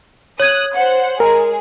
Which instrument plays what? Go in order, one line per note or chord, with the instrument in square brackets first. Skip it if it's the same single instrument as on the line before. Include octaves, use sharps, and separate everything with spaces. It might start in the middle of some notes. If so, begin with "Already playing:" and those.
[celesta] C#5 G#6 [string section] D#6 F#6
[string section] C5 F#5
[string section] G#3 G#4 [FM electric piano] A#4